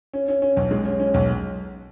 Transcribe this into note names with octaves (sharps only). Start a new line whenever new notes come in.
C#4
C#4
C#4
B1
G#3
C#4
C#4
B1